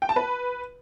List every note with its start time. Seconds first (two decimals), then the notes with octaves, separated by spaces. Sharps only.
0.02 G5
0.09 A5
0.16 B4